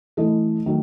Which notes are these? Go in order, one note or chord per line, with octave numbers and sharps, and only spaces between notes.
E3 A3 E4 A4 D#5
D#3 F#3 A3